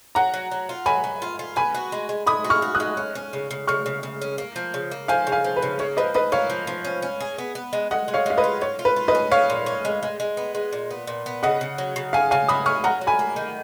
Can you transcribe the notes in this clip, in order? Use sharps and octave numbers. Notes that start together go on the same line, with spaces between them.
F#3 F#5 A#5
F#3
F#3
F4
F#3 G#5 B5
F#3
F4
F4
B3 G#5 B5
F#4
G#3
G#3
G#3 B5 D#6
F#4
C#6 F6
F#4
D#6 F#6
G#3
C#4
C#4
C#3
C#3
C#3 C#6 F6
C#3
C#3
C#4
A#3
F3
C#3
A#3
F3 F5 G#5
C#3
F5 G#5
F3
B4
C#3
A#3 C#5
F3 B4 D#5
F3 B4 D#5
A#3 C#5 F5
F3
F3
C#4
C#4
G#4
B3
B3
G#3
G#3 D#5 F#5
G#3
C#5 F5
G#3 F5
B4 D#5
F4
F4 C#5
F4
B4
F4
B4 D#5
C#4
C#4 C#5 F5
A#2
C#4
G#3
G#3
G#3
B3
G#3
A#2
B3
A#2
B3
C#3 D#5 F#5
C#3
F#3
C#3
C#4 F5 G#5
C#3 F5 G#5
F#3 B5 D#6
C#4 C#6 F6
F#3 F#5 A#5
F#3
G#5 B5
A#3
D#3